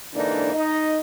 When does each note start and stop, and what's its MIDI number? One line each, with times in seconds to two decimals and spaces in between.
0.14 0.51 44
0.14 0.51 50
0.14 0.51 52
0.14 0.51 58
0.14 0.51 62
0.14 0.51 63
0.54 0.98 63
0.54 0.98 75